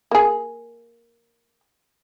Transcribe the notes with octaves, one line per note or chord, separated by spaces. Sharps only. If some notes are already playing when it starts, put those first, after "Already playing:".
A#3 G#4